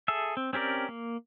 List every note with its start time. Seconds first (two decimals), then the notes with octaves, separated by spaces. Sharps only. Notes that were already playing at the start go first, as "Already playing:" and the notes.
0.08 G#4 A4 E5
0.37 C4
0.53 C4 C#4 G4 A#4 D5
0.89 A#3